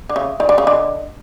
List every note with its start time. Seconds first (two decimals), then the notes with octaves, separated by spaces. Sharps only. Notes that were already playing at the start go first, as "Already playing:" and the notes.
0.09 D3
0.16 C#3 E5
0.40 D#3 D5
0.49 D3
0.58 C#3
0.64 D3 D#5